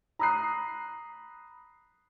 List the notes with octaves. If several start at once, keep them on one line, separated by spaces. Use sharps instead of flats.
A#5 B5 D#6 F#6 C7